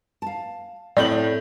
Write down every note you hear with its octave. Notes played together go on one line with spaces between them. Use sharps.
F5 A5
A2 A3 C4 A4 D5 G6 F#7